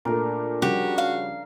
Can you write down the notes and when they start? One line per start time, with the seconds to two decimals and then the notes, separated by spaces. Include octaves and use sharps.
0.05 A#2 A3 D4 A#4
0.62 C#3 F3 G3 F#4 G4
0.98 F5